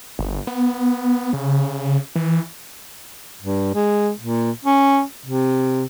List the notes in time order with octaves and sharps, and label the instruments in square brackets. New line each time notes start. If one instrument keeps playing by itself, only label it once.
[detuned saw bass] G1
B3
C#3
E3
[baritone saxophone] G2
G#3
A#2
C#4
C3